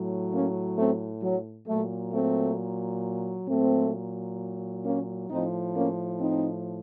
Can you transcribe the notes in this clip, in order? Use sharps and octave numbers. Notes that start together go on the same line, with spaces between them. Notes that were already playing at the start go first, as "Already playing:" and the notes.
Already playing: A2 F#3
A#3 C#4
A3 C4
F#3
A#2 F#3 A3
A3 C4
A#2 F#3 A3 C4
A#3 C#4
A2 F3 C4 D#4
A#3 C#4
C4 D#4